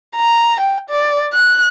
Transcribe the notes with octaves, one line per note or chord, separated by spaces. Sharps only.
A#5
G5
D5
F#6